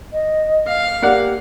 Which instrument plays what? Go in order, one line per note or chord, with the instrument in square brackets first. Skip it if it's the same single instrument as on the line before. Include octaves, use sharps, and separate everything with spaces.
[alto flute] D#5
[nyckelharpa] F5
[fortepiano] A#3 D5 F#5 [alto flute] G4